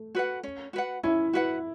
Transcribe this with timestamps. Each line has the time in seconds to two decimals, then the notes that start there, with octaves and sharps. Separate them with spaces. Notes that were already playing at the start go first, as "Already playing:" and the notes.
Already playing: A3
0.15 F#4 B4 F#5
0.43 C#4
0.73 F#4 B4 F#5
1.03 C#4 E4
1.33 F#4 B4 F#5